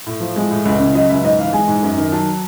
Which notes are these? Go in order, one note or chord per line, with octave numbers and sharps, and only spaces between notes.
A2
F3
G#3
A2
C#2 D5
C#3
F#3 D#5
C#2 E5
G#2 D#5
E3 F5
G#3 G#5
G#2
F#2
D#3
F#3 A5